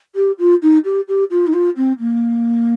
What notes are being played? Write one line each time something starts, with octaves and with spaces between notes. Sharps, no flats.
G4
F4
D#4
G4
G4
F4
D#4
F4
C4
A#3